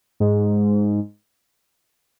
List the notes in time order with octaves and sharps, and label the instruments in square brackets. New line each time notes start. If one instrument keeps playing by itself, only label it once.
[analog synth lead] G#2